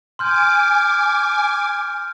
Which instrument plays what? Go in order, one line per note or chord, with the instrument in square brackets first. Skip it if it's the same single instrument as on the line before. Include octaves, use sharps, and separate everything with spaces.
[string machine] G#5 D6 [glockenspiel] C6 F6 G6